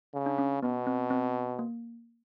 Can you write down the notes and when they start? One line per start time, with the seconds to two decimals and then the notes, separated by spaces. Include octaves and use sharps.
0.14 C#3
0.26 D4
0.38 C#4
0.62 B2 B3
0.87 C4
1.10 C4
1.59 A#3